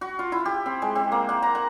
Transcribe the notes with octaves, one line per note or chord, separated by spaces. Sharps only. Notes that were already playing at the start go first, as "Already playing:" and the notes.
F#4
F4
E4
G4
C4
G#3
C4
A#3
F#5
A#5
F#5